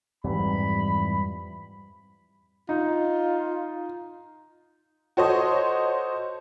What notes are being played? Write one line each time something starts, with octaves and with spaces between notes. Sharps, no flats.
F2 G#2 E3 G3 B5
D#4 F4
F#4 A4 C5 C#5 D#5